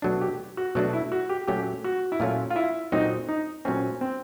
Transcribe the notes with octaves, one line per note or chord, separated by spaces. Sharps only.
B2 F#3 A3 D4
G4
F#4
B2 F#3 A3 D4 F#4
E4
F#4
G4
A#2 F#3 A3 C#4 G4
F#4
E4
A#2 F#3 A3 C#4 F4
F4
E4
A#2 F#3 A3 C4 D#4
D#4
A#2 F#3 A3 C4 C#4
C4